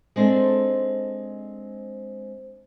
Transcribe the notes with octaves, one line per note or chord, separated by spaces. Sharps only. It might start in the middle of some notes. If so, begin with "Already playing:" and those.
G#3 C4 D4 D#4 A4 C5